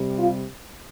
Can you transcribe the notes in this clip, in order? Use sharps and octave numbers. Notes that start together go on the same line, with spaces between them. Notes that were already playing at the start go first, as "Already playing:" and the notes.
Already playing: C3 G3
F4